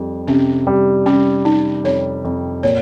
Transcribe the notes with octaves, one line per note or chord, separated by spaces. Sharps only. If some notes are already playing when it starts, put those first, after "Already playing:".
Already playing: F2 G3
C3 C#4
G3
G3 C#4
G3 D#4
F2 C#5
F2
A#2 C#5